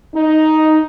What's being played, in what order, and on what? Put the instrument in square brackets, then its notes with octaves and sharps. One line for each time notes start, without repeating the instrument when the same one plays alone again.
[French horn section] D#4